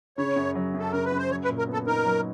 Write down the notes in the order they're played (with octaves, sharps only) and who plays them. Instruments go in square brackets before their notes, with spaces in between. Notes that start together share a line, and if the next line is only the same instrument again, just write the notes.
[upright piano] C#3 [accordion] C#5
[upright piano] F#2
F#3
[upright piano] F#2 [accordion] A4
[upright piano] C#3 [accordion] A#4
[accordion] B4
[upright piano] F#2
[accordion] C5
[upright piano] F#3 [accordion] C#5
[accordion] B4
[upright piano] A#2
[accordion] A#4
[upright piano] B3
[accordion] A4
[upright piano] D#4 [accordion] A#4
[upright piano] F#3